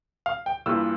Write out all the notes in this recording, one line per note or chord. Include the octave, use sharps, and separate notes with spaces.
F5
G5
G2 E3 A#3 F4 E6